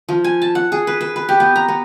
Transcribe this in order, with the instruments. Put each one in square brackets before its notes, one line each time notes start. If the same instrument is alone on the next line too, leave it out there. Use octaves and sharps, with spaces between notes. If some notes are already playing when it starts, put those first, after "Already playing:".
[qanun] F3
G#5
A5
F#5
G#4
B4
B4
B4
G4
B3
A#5
B3